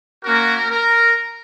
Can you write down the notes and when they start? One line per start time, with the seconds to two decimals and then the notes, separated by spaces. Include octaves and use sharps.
0.23 A#3 C#4 F#4 A#4
0.71 A#4